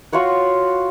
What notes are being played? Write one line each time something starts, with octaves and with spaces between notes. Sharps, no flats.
F4 F#4 C#5 F#5